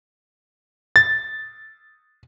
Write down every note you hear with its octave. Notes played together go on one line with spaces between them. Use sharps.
A6